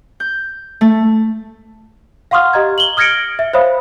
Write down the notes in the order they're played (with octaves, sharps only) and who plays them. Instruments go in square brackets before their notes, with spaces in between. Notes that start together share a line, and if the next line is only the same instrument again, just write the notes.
[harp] G6
A3
[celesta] F5 F#5 C6 C#6 D#6 F6
G4 D#5 A#5 G#6
F#7 G7
D#6 F6 G#6 A#6 C#7 D7
E5
C5 C#5 E5 F5 B5 D#6